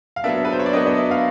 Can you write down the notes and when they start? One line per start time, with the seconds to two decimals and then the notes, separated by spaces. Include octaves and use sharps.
0.16 F5
0.24 F#3 B3 D4 E5
0.45 B4
0.53 C5
0.59 C#5
0.66 D5
0.73 F#3 B3 D4 D#5
0.87 D#5
0.98 E5
1.11 F5